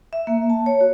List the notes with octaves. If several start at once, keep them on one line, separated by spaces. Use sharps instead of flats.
E5
A#3
A5
C#5
F#4